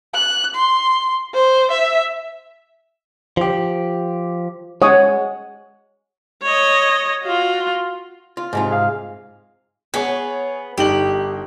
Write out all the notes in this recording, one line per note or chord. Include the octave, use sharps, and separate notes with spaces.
F#6
C6
C5
E5
F3 G4
G#3 C#5 F#5 D#6
C#5 D#5
F4 F#4
F4
G#2 C3 F4
G#4 F5
B3 G#4 C#5
G1 D#4 G4 F#7